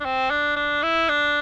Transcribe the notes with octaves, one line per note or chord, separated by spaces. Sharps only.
D4
C4
D4
D4
E4
D4